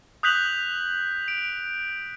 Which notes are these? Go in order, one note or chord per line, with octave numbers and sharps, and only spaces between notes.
D#6 F#6 G6 B6 F7 F#7
D7